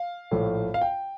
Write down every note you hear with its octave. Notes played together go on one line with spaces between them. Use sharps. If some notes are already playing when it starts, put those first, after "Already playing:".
Already playing: F5
A#1 A2 A3
F5
G5